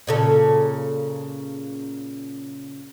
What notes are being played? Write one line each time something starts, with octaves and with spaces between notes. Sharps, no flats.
A#2 C#3 A4